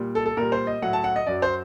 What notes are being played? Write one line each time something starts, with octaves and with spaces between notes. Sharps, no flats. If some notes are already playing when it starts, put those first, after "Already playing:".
Already playing: A#2 G3
A4
A4
A#2 G3 A#4
C5
D#5
A2 F#3 F#5
A5
F#5
D#5
F#2 F#3 D5
C5